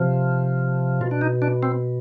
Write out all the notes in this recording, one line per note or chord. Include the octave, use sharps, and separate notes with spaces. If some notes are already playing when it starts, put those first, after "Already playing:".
Already playing: C3 F3
B2 F4
D4
D#4
D4
C4